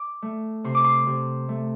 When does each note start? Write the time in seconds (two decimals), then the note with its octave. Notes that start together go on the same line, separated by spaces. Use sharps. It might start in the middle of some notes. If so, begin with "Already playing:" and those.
Already playing: D6
0.22 A3
0.64 C3 C6
0.75 D6
0.84 C6
1.07 C3
1.49 A3